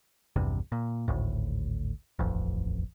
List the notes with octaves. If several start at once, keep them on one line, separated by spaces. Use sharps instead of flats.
A#1 E2 G2 C3
A#2
G#1 D2 A2
D#1 A1 F2